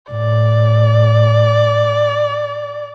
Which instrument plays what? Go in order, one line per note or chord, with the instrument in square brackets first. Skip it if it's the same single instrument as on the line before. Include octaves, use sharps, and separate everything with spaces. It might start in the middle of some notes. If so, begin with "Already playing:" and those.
[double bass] A2 [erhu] D5